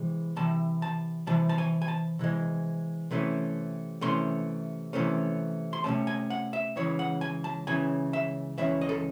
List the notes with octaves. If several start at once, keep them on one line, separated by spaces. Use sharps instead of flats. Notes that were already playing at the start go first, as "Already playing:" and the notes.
Already playing: C3 E3 G#3
C3 E3 A5
A5
C3 E3 A5
A5
G#5
G#5
A5
C3 E3 G#3
C3 E3 A3 C#4
C3 E3 A3 C#4 C6
C3 E3 A3 C#4
C6
C3 E3 A3 C#4 A5
G#5
F#5
E5
C#2 C#3 E3 C#5
F#5
G#5
A5
C#2 C#3 E3 G#5
E5
C#2 C#3 E3 E5
D#5
A4